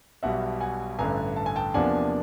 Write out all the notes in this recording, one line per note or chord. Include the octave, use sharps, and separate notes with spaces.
B1 B2 G3 E5 F#5
F#5 G#5
A1 G2 D3 G#5 A#5
A5
G#5
G5 A5
E2 C3 F3 A#3 D4 F#5 G#5